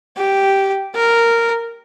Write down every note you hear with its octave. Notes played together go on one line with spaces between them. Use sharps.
G4
A#4